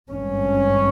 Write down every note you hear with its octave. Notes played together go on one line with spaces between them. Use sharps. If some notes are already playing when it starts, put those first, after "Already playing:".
G#1 G2 C#4